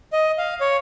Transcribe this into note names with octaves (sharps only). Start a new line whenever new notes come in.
D#5
F5
C#5